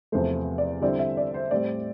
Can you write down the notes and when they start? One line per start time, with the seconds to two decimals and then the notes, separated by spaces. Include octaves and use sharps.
0.12 E2 C3 F3 A3 C5
0.58 D5
0.82 D3 G3 C4 E4 D5
0.99 E5
1.17 D5
1.34 C5
1.51 A2 G3 C4 D5